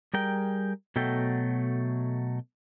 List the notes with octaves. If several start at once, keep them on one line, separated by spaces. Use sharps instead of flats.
G3 G#4 A#4 G5
B2 F#3 A3 A4 G5